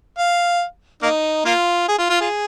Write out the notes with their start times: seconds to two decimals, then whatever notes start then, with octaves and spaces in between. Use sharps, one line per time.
0.18 F5
1.03 A#3 D#4
1.45 A#3 F4
1.88 G#4
1.98 F4
2.10 F4
2.21 F4 G#4